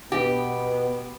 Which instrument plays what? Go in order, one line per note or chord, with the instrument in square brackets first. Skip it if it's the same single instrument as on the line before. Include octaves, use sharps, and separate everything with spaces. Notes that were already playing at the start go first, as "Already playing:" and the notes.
[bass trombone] B2 [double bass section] B3 [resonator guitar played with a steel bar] G4